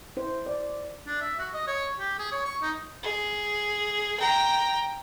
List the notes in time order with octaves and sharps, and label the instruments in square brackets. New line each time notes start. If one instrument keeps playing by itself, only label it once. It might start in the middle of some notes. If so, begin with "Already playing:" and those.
[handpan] E4 C5
D5
[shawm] D4
E5
F#4
D#5
C#5
G4
G#4
C#5
C#6
D#4
[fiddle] G#4
G5 A#5